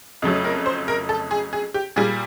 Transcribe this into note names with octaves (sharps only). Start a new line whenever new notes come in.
F2 C#3 F#3 A3
A#4
C5
A#4
A4
G#4
G#4
G4
A#2 G3 G#4